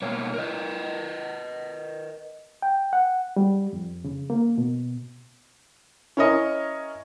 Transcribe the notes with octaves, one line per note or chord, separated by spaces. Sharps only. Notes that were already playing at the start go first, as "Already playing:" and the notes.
B2 A#3 C#5
A#4 B4 D#5
G5
F#5
G3
F2
C#3
A#3
B2
C#4 E4 A#4 C#5 D#5